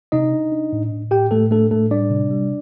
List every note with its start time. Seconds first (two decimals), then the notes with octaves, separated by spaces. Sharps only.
0.12 C3 D#4 D#5
0.32 D4
0.52 D4
0.73 A2
0.92 A2
1.11 A2 G4 G5
1.31 A2 A3 A4
1.51 A3 D4 A4
1.71 A2 A3 A4
1.90 G3 D4 D5
2.11 C3
2.30 G3